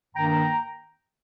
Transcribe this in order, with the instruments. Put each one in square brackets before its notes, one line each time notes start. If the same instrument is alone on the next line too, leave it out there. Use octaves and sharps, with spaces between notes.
[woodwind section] G2 D#3 A#3 G5 A#5